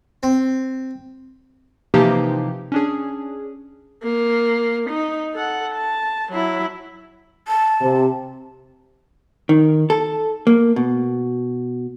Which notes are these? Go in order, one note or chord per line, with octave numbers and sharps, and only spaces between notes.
C4
C3 E3 F3 A#3 D#4 G4
C#4 D4 G#4
A#3
D#4
A4 F#5
A5
F#3 E4
A5
C3
D#3
A4
A#3
B2